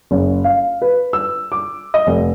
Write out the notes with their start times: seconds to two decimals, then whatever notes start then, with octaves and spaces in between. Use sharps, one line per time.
0.11 F#1
0.44 F5
0.82 B4
1.13 E6
1.52 D6
1.94 D#5
2.07 F1